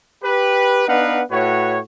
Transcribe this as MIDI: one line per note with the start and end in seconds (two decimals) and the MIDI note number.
0.24 0.85 67
0.24 0.85 71
0.88 1.22 59
0.88 1.22 62
0.88 1.22 63
0.88 1.22 71
0.88 1.22 77
0.88 1.22 78
1.31 1.78 45
1.31 1.78 66
1.31 1.78 71
1.31 1.78 73